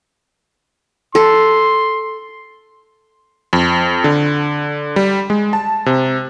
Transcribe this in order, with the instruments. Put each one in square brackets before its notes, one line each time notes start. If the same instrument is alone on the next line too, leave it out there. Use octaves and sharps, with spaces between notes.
[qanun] A4 [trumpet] C6
[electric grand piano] F2
D3
G3
G#3
A5
C3